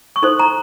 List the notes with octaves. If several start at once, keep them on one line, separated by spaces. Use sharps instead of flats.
C#6
D#4 A4 C5 C6
A#5